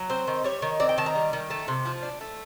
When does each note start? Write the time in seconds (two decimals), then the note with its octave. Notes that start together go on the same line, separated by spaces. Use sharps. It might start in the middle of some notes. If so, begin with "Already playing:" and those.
Already playing: F#3
0.10 C4 C5
0.27 D#3
0.44 G3 C#5
0.62 D#3
0.80 C4 D5
0.89 G5
0.98 D#3 A5
1.06 A#5
1.15 G3
1.33 D#3
1.50 A3 A5
1.68 C3
1.85 F3
2.02 D4
2.21 A3